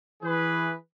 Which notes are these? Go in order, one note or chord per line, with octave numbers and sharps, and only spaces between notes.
E3 G#4 B4